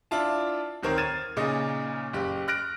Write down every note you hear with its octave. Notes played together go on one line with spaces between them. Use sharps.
D4 E4 F4 A5
D1 D#3 C4 A#4 C#5 C7
F6 G#6 A6 D#7 E7
A#2 C#3 D#4
F#1 G4
F6 F#6 A#6 D7